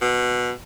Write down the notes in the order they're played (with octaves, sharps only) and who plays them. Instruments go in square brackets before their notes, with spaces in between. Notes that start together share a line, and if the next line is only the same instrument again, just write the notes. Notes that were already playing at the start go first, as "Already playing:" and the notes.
[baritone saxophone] B2